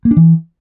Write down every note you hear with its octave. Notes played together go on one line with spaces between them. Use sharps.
A#3
D4
E3